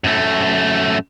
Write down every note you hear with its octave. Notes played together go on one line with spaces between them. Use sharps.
F#2 A3